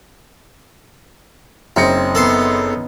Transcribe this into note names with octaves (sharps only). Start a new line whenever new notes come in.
F#1 C4 D#4 C#7
B3 D#4 A4 C6